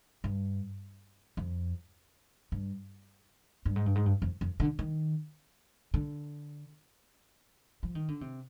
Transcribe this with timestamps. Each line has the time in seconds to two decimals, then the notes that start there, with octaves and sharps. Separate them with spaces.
0.24 G2
1.37 F2
2.52 G2
3.65 G2
3.76 G#2
3.86 G2
3.95 G#2
4.06 G2
4.22 F2
4.41 F2
4.60 D3
4.79 D#3
5.94 D3
7.83 F3
7.95 D#3
8.08 D3
8.21 C3